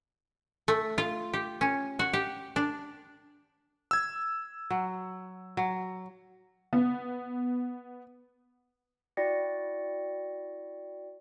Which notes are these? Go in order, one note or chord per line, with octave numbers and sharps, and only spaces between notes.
A3
F4
G4
C#4
F#4
G4
D4
E6 G#6
F#3
F#3
B3
E4 F#4 D5 G5 A#6 C#7